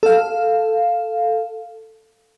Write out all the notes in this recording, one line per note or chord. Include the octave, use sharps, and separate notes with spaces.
A4 F5